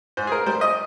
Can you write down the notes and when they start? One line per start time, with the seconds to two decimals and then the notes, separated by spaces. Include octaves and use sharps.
0.17 G#2 C5
0.27 G#4
0.32 A#4
0.46 G3 C5
0.61 D#5